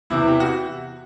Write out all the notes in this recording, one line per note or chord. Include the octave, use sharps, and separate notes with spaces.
E2 C3 E3 E4
G4
F#4